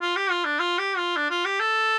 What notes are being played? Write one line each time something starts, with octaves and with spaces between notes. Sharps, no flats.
F4
G4
F4
D4
F4
G4
F4
D4
F4
G4
A4